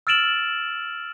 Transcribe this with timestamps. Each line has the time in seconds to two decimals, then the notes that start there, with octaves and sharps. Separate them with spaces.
0.07 E6 F6 A6 D7 E7 F#7